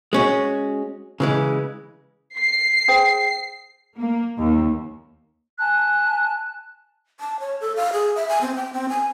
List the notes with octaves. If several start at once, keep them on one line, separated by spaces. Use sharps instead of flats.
G#3 C#4 F#4
C#3 E3 G#3
C7
G#4 C5 G5
A#3
D#2
G#5 A5 F#6
A5
C#5
A4
F5
G#4
E5
G#5
C4
G5
C4
G#5